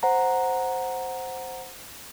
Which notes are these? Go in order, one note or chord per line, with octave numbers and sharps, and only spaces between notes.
C5 F#5 A#5